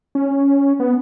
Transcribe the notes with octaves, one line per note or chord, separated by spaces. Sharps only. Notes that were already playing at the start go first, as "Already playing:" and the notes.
C#4
B3